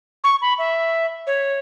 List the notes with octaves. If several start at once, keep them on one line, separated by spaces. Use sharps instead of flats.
C#6
B5
E5
C#5